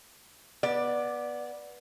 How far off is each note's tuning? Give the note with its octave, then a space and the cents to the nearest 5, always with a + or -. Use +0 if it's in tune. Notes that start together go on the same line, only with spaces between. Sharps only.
B3 -15 D5 +5